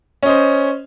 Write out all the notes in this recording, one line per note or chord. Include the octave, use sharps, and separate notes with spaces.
C#4 C5 D#5